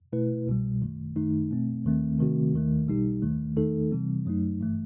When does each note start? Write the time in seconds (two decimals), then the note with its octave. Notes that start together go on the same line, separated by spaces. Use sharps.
0.13 B2 A3 E4 B4
0.47 C2 B2 G3
0.82 G1 F#2 D#3 A3
1.16 F#2 D#3 A3 D#4
1.51 B2 A3 C4
1.84 D#2 D#3 A3 C4
2.19 C3 D#3 A3 C4 F#4
2.54 D#2 D#3 A3
2.88 B1 B2 G3 D#4 G4
3.22 D#2 D#3 A3
3.56 E2 D#3 A3 D#4 A4
3.92 C3 E3 G3 C4
4.25 F#2 F#3 A3 D#4
4.59 G1 G2 E3 A3